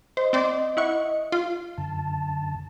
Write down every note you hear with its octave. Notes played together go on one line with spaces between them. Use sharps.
C5 D#5
C4 C5 D5
E4 F#5 C#6
F4
F#2 D3 A5